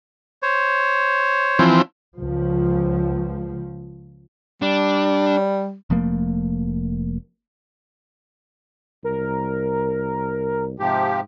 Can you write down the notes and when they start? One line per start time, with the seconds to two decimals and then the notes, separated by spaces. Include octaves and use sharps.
0.43 C5 C#5
1.59 E3 F3 C4
2.19 C#2 F3
4.62 G3 D4
5.90 F1 F3 A3 A#3
9.04 C2 A#4
10.80 G#2 C3 F3 G4